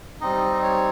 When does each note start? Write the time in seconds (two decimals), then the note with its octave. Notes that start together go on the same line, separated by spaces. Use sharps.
0.21 G3 C4 D#4 D#5
0.63 C#5